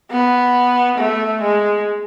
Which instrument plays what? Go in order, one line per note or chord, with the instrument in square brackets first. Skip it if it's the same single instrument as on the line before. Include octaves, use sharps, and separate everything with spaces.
[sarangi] B3
A3
G#3